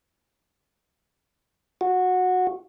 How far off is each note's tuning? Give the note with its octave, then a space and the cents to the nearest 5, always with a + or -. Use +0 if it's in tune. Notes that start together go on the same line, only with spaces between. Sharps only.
F#4 -15